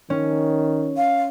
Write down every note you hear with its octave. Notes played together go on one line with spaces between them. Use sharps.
D#3 C#4
F5